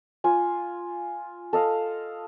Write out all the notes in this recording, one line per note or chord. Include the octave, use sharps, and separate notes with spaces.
F4 G#5
A4 D#5 F5